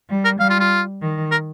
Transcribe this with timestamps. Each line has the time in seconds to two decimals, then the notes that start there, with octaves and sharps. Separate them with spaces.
0.09 G3
0.25 A#4
0.40 G3 F5
0.50 F4
0.60 F4
1.01 D#3
1.31 A#4